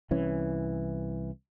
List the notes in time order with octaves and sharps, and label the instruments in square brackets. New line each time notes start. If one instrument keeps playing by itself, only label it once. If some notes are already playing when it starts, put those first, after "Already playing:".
[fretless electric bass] C2 E3 C#4